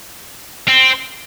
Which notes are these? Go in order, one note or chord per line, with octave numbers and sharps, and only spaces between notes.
C4